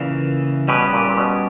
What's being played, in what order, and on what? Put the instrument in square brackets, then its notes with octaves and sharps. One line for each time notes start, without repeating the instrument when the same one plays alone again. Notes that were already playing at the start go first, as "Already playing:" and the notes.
Already playing: [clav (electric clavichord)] A#2 [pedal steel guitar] C#3 E3 A#3
[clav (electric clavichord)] B2 [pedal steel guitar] G3 C#4 G4 B4
[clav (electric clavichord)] A#2
A#2
B2